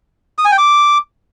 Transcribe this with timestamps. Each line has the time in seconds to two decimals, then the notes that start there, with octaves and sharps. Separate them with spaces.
0.38 D#6
0.45 G#5
0.52 G5
0.58 D6